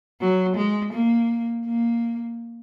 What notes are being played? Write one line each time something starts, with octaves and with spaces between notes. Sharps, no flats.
F#3
G#3
A#3
A#3